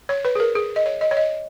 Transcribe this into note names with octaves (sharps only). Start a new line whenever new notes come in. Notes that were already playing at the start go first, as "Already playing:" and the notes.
C#5
B4
G#4
A#4
G#4
D#5
C#5
D#5
C#5
D#5